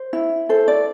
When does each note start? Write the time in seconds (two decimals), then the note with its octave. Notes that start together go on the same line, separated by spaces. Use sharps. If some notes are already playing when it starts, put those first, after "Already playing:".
Already playing: C5
0.13 E4
0.49 A4 C5
0.68 D5